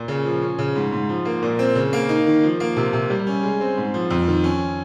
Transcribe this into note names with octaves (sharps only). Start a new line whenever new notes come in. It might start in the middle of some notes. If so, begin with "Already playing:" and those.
Already playing: A#2
C#3
F3
C#4
C#3
G#2
G#2
F3
A#3
A#2
C4
C#3
A#3
D#4
D#3
F3
A#3
C3
C3
G3
C#4
G#3
C4
G#2
F3
F2
D#3
C#4